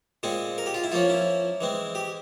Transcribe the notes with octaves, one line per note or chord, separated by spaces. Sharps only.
A#2 G#3 C4 G#4
A#4
G4
F4
E4
F3 A#3 C#4 F4
E4
E3 G#3 C4
G4